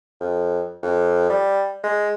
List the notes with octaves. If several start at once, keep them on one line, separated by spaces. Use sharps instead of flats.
F2
F2
G3
G#3